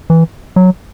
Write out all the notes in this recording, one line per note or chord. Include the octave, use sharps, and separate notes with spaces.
E3
F#3